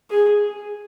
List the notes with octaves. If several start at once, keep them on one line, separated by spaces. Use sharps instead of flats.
G#4